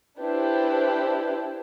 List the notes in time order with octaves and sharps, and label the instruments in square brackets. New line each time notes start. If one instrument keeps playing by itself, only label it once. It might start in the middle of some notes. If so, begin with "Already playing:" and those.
[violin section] D4 E4 G4 B4 C5